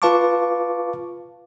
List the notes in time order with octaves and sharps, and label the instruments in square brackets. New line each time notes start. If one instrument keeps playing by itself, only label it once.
[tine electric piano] F4 B4 F5 A5 C#6 D6